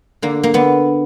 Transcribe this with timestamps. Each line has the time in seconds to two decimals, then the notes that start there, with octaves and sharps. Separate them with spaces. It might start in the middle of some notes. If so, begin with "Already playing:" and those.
0.22 D3 A#3
0.43 A#3
0.54 D3 B3